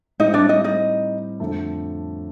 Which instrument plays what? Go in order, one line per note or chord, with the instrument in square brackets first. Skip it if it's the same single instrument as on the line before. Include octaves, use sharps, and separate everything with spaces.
[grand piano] A2 G3 C4 [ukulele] D#4 D#5
[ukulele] D4 D5
D#4 D#5
D#4 D#5
[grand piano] F2 D3 A3